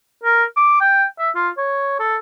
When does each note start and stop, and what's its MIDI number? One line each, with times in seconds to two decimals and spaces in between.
0.24 0.44 70
0.57 0.77 86
0.80 1.05 79
1.19 1.29 76
1.35 1.49 65
1.58 1.98 73
2.00 2.16 69